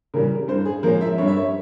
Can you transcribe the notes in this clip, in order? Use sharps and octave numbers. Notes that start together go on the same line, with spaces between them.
C#3 E3 G3 A#4
G2 C5
G#4
F3 G#3 C#4 A#4
E5
G2 C#5
E5
C#5